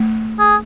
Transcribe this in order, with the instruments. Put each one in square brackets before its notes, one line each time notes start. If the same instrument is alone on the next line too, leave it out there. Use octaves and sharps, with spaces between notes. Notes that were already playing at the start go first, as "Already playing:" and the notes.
Already playing: [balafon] A3
[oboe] G#4